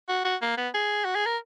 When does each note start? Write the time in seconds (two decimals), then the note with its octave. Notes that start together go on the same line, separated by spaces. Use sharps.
0.09 F#4
0.25 F#4
0.42 A#3
0.57 B3
0.74 G#4
1.05 F#4
1.15 G#4
1.26 A#4